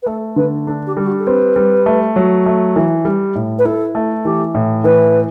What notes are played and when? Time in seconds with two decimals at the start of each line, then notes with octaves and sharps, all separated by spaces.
0.02 B4
0.06 A3 A4
0.36 D3 B4
0.67 D4 A4
0.86 G4
0.97 G3 G4
1.06 F#4
1.19 A4
1.26 C4 B4
1.56 G3
1.86 A3
2.16 F#3
2.46 A3
2.76 E3
3.05 G3
3.35 A2
3.58 B4
3.65 E4 A4
3.95 A3
4.24 E3 G4
4.55 A2
4.84 E3 B4